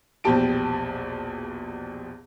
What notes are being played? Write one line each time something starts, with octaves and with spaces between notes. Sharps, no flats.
A#1 E2 B2 G4 A5 D7